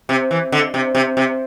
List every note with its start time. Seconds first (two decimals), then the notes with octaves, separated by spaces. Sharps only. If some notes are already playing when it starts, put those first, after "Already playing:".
0.09 C3
0.31 E3
0.52 D3
0.74 C3
0.95 C3
1.17 C3